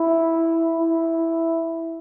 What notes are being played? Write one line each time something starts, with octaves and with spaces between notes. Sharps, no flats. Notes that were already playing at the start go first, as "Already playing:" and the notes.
Already playing: E4
E4